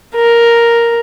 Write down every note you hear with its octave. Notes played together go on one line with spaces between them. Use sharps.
A#4